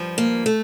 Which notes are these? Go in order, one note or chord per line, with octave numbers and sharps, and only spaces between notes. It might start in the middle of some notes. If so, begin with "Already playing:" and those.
Already playing: G2 F3
A#3
A3